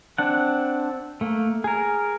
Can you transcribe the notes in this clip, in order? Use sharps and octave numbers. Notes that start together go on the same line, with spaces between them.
C4 D4 F#5
A3 A#3
G#4 A#4